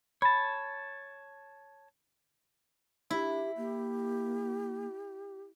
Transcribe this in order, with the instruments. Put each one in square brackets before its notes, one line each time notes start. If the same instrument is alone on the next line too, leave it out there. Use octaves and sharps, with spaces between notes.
[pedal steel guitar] C#5 A5 [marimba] B5
[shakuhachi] D4 [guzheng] E4 [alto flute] G4
[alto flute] A#3 [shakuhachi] G4